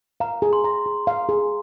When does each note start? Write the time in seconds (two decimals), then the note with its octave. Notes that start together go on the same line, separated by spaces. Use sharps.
0.20 F5 A#5
0.42 G#4
0.53 C6
0.64 A#5
0.86 G#4
1.07 F5
1.29 G#4